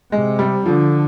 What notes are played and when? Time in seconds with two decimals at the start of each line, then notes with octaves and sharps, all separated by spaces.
0.12 C3 G#3
0.39 G3
0.65 D3 F3